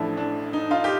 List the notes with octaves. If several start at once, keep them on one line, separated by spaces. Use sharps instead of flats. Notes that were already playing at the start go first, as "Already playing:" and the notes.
Already playing: A1 A2 F3 D4 E4
D4
D#4
D#4 F4
G4